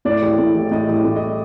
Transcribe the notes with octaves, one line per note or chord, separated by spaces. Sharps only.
A2 D5
A1
A2
A1
A2 D#5
A1
A2
D#5